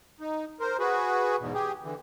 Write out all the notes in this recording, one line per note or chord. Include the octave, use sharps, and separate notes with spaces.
D#4
A#4 C5
F#4 G#4 B4
E2 G#2 B2
G4 G#4
D3 E3